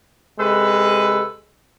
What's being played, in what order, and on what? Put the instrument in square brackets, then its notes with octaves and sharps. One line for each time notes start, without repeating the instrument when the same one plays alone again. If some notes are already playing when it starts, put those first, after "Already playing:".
[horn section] C3 G#3 A4 B4